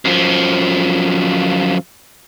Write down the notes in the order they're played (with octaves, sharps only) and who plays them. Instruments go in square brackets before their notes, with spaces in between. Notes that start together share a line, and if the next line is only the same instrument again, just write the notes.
[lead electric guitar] F#2 F3